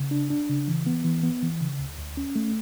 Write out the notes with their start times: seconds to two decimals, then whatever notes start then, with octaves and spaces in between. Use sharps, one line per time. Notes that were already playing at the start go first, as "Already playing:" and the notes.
Already playing: C#3
0.11 D4
0.30 D4
0.49 C#3
0.68 E3
0.86 B3
1.05 E3
1.23 B3
1.43 E3
1.61 C#3
1.79 D2
1.98 D2
2.17 C#4
2.36 A3